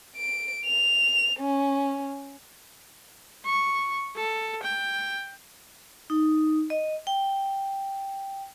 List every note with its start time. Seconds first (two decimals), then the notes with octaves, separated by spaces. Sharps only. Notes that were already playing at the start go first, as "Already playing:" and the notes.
0.17 D7
0.66 F7
1.41 C#4
3.45 C#6
4.16 A4
4.63 G5
6.10 D#4
6.70 D#5
7.07 G5